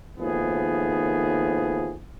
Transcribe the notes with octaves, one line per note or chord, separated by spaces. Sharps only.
G#1 D#2 A2 F3 B3 G#4